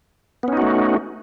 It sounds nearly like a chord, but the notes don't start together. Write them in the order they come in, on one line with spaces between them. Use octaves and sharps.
B3 C#4 D#4 F#4 A3